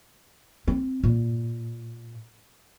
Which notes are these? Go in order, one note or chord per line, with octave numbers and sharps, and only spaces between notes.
C4
A#2